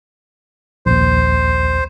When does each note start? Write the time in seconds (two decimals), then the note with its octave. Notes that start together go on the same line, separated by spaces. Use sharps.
0.86 A#1 D#2 C5